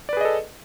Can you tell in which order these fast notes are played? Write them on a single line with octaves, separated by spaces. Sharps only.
D5 B4 G#4 D#5 A4